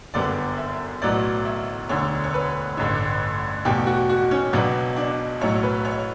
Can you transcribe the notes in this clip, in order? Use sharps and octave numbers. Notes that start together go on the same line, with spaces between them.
G1 F#2 D3 G3 B3 D5
E5
B1 A2 F#3 B3 D5
E5
E1 D2 D3 C#5
C#5
B4
A1 G2 D3
E2 B2 A3 G4
F#4
F#4
C#4
C#2 B2 F#3 B3 D4
D4
B1 A2 F#3 C#5
B4
C#5